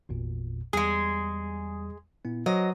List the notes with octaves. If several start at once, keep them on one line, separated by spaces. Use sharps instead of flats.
G#1 E2 A#2
E2 G3 G#3 G#4 D#6
A#2 B3 E4
F#3 B4 C5 D#5